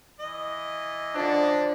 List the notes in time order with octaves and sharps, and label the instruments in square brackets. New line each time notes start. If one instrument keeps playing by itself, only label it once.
[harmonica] E3 D#5
[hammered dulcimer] D3 F3 [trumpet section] D4